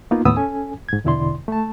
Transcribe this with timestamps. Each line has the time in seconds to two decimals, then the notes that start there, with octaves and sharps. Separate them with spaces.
0.11 A#3 B3 D#4 F4
0.25 D#2 A2 A3 B3 D#6 E6
0.37 C#4 A4 G#5
0.89 G#2 G#6
1.04 E2 B2 D3 E4 D5 C6
1.48 A3 A5